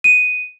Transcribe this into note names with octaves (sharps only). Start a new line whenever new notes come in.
D#7